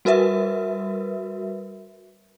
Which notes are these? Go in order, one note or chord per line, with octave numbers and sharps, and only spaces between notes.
G3 F#4 A#4 B4 E5